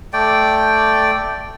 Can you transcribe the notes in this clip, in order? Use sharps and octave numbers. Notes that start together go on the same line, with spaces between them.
A3 D5 G5